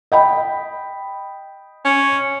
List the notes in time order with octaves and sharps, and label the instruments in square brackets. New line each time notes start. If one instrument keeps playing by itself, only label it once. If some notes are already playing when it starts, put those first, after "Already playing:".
[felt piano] D#5 G5 B5
[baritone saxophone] C#4